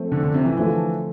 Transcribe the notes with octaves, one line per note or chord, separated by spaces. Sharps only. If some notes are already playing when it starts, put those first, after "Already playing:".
Already playing: F3 A3 C4
D3
D3
C3
E3
D3 E3 F3 A3